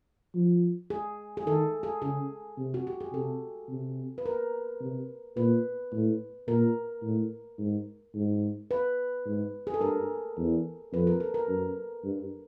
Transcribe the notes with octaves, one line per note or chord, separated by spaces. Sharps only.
F3
G#4
G#4
D#3 A4
G#4
C#3 G#4
C3
F#4
G4
G#4
C3 A4
C3
B4
A#4
C3
A#2 B4
A2
A#2 A#4
A2
G#2
G#2
B4
G#2
G#4
A4
G2 A#4
E2
F2 B4
A#4
A4
A#4
F#2
G2